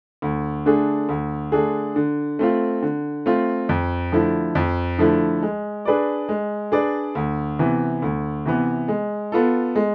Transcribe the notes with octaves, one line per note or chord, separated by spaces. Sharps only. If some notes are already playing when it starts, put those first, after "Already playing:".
D2
D3 A3 D4 G#4
D2
D3 A3 D4 G#4
D3
A3 C4 F4
D3
A3 C4 F4
F2
D3 F3 A3 E4
F2
D3 F3 A3 E4
G#3
D4 G#4 B4 D5
G#3
D4 G#4 B4 D5
D2
C3 E3 B3
D2
C3 E3 B3
G#3
B3 F4 A4
G#3